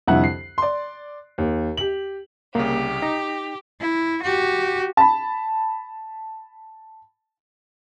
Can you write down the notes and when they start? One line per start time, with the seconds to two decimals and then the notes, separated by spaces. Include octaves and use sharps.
0.07 C2 F2 D3 E4 F#5 F#6
0.24 C7
0.58 D5 C6
1.38 D#2
1.77 G4 F#7
2.55 C2 C#3 A#3 G4
3.02 D#4 A#6
3.80 E4
4.23 F#4 G4
4.97 A5 B5